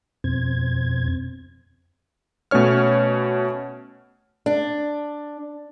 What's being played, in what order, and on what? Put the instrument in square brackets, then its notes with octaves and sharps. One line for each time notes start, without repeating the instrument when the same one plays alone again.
[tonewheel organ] F2 B2 C4 G#6
[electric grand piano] B2 A3 C#4 C#5 F6
[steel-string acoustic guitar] D4